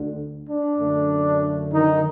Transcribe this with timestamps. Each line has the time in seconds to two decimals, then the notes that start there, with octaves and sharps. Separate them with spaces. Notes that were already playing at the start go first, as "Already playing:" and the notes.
Already playing: D2 D3
0.48 D4
0.79 F#2 D3 A3
1.73 D#3 D#4